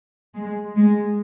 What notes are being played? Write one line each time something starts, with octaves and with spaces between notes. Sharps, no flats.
G#3
G#3